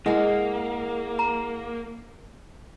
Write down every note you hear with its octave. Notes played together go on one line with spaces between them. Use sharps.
G#3 A#3 E4 G#4 A#4 F#5
A#5